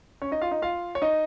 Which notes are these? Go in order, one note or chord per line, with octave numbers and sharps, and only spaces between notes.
C#4 C#5
D#4 D#5
F4 F5
D#4 D#5
F4 F5
C#5
D#4 D#5